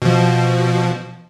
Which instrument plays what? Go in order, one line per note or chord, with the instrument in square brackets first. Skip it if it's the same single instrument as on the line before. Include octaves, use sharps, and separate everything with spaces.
[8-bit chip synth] B2 F3